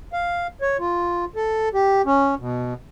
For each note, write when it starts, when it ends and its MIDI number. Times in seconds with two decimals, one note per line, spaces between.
0.13 0.47 77
0.61 0.77 73
0.79 1.25 65
1.36 1.69 69
1.74 2.02 67
2.06 2.35 61
2.39 2.74 47